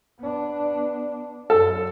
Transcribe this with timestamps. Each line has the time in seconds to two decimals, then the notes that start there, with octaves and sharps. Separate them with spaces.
0.20 B3 D4
1.50 F#2 A4